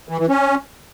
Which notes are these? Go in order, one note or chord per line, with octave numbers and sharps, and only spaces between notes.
E3
E3
C#4